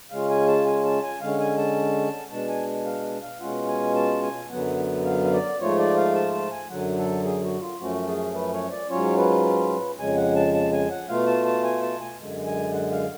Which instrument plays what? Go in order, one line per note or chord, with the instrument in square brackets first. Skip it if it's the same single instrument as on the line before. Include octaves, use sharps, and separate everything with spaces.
[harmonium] C#3 G#3 C#4 F4 F5
G#5
A5
G#5
A5
G#5
D3 G#3 C#4 F5
G#5
A5
B2 G#3 D4 A5
G#5
F5
F5
B2 G#3 C#4 F4 F#5
G#5
A5
G#5
F#2 D3 F#3 B3 F#5
F5
F5
D5
G#2 F3 A3 F4 C#5
D5
F5
A5
A5
G#5
F#2 D3 F#3 F#5
A4
G#4
F#4
F4
F#2 F3 A3 C#4 F#4
G#4
B4
C#5
D5
G#2 F#3 C#4 F4 C#5
B4
F2 C#3 G#3 G#5
F#5
A5
A5
G#5
F#5
B2 A3 F4 F5
A5
A5
G#5
A5
G#5
F#2 D3 G#3
G#5
F#5
F5